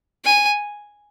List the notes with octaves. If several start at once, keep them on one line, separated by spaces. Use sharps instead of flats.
G#5